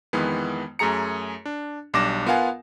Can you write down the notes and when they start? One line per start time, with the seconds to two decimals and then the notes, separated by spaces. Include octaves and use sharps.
0.13 F2 D#3 E3 G#3 B3
0.79 F#2 A3 G#4 A#5 C#7
1.46 D4
1.94 B1 G3 D4 D6 A#6 E7
2.26 B3 F4 A#4 F5 F#5 G#5